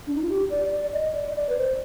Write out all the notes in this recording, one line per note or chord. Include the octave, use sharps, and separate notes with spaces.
D4
D#4
F4
G4
D5
D5
D#5
D5
D#5
D5
B4
C5